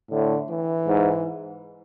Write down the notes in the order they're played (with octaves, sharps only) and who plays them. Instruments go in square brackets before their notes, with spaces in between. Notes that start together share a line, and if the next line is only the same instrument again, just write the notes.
[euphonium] A2 [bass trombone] D3
[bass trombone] E3
[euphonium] G#2